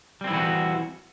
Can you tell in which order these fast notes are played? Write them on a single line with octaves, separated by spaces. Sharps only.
G3 C4 E4 E3 F#4